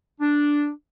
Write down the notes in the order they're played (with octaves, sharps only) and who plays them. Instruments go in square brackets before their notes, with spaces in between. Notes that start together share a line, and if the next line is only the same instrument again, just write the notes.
[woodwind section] D4